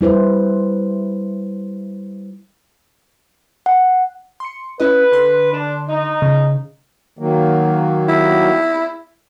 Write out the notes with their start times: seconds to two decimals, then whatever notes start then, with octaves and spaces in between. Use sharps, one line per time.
0.01 G3 E4 B4 C5
3.66 F#5
4.40 C6 C#7
4.80 C#4 E4 B4 D#5
5.12 D3 C6
5.52 D4
5.88 D#4
6.22 C#3
7.19 D#3 F#3 A#3
8.08 E4